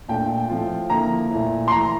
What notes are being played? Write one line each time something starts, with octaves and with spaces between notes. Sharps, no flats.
A#2 A3 D4 F4 G5
A2 F3 C4 F4
D3 F3 A#3 E4 A#5
A#2 A3 E4
C6
E3 A3 E4 A#5